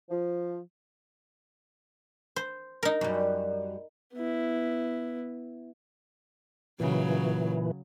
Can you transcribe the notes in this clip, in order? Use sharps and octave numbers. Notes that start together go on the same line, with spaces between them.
F3
C5
D#4 A#4
F#2 G3
B3 E4
A#2 C#3 E3 F#3